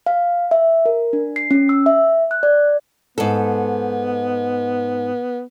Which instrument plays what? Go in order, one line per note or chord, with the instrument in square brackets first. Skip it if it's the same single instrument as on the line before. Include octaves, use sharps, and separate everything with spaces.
[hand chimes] F5
E5
A#4
D4
C7
C#4
E6
E5
F#6
D5
[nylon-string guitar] G#2 A4 [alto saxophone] B3